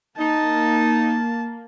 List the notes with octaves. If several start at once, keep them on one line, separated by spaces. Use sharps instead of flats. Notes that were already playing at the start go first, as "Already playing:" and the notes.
A#3 D#4 A5